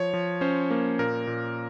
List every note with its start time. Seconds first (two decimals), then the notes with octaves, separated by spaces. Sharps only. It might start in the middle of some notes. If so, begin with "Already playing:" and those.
Already playing: F3 C#5
0.14 F3
0.41 C#4 C5
0.71 A#3
0.99 A#2 A#4
1.27 A#2